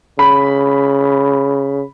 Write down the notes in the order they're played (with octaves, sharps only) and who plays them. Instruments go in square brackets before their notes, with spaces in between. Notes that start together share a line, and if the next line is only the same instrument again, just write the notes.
[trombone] C#3 [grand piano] B5